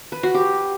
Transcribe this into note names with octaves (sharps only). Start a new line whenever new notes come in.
B4
F#4
G4